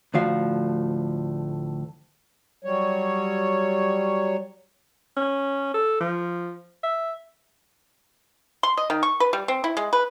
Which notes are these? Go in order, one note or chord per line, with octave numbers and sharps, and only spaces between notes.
D2 A2 F3 F#4 F5
F#3 G3 C#5
C#4
A4
F3
E5
C6
D#5
D#3
C#6
B4
G3
C4
E4
G#3
B4